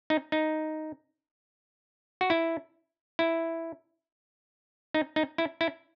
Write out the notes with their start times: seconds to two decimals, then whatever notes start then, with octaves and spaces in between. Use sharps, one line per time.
0.10 D#4
0.32 D#4
2.21 F#4
2.30 E4
3.19 E4
4.94 D#4
5.16 D#4
5.38 E4
5.61 E4